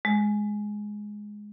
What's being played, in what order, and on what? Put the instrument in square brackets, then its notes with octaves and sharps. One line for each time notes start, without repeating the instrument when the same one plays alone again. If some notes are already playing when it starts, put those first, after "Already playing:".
[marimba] G#3